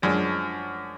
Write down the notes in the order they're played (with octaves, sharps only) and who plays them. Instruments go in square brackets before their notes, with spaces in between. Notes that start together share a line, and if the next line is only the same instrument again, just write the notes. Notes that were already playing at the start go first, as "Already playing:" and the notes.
[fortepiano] F#2 [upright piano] F3 G#3 D4 G#4 D5